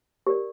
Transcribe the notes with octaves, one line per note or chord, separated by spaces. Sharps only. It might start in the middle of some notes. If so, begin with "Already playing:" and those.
G4 A#4 D5